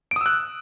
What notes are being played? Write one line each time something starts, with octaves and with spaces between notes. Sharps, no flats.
D#6 E6 F#6 D7